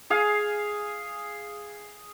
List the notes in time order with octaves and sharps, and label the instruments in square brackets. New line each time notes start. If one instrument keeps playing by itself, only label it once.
[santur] G#4 F5 G#5